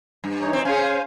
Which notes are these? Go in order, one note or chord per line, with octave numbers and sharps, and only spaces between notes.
G2
E3 D#4 C#5
C4
C#4 G#4 C5 F5 G#5